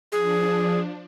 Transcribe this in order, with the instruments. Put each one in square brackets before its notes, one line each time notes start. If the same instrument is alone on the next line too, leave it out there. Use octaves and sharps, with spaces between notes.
[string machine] F3 D4 [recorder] G#4